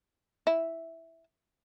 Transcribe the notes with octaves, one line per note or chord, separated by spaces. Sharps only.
E4